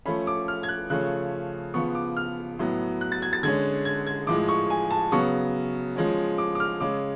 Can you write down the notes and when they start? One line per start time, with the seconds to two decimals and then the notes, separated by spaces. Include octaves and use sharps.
0.05 F3 A3 C#4 B5
0.27 D6
0.48 F6
0.63 G#6
0.69 F#6
0.90 C#3 F3 A3 C#4 F#6
1.74 C#3 F3 B3 C#6
1.95 D6
2.17 F6
2.59 A2 F#3 B3
3.01 F#6
3.12 A6
3.22 G#6
3.33 A6
3.43 D3 G#3 C#4 G#6
3.85 G#6
4.07 G#6
4.27 A2 F3 G#3 D6
4.48 C#6
4.70 G#5
4.91 A5
5.12 C#3 F#3 B3 C#6
5.96 F3 G#3 C#4
6.38 D6
6.55 D6
6.60 F6
6.80 C#3 G#3 C#4 D6